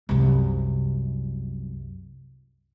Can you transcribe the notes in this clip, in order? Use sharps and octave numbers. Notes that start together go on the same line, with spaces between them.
C2 F#2